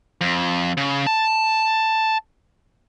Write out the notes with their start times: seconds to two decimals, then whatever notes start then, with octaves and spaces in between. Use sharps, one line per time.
0.21 F2
0.77 C#3
1.07 A5